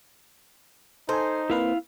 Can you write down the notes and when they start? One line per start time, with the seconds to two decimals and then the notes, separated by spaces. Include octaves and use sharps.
1.09 D#4 A4 C5 G#5
1.50 A#3 C4 E4 B4 F5